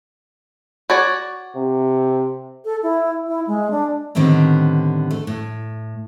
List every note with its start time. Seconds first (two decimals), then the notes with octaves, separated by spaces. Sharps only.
0.90 F#4 C#5 D5
1.56 C3
2.65 A4
2.83 E4
3.27 E4
3.47 G#3
3.71 D4
4.15 A2 D3 D#3 G3 B3 C4
5.11 A3
5.27 A2